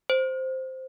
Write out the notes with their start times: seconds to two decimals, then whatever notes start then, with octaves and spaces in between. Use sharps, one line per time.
0.10 C5